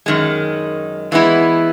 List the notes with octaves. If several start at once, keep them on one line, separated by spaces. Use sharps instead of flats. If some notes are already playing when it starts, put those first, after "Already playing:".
F#2 D#3 G#3
E3 G#3 B3 E4